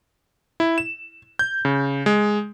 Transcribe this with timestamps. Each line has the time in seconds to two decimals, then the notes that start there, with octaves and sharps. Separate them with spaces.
0.60 E4
0.78 E7
1.39 G6
1.65 C#3
2.06 G#3